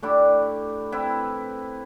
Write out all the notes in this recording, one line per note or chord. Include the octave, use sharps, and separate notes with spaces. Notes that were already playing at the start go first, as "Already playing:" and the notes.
A3 D4 E4 G4
C4 E4 B4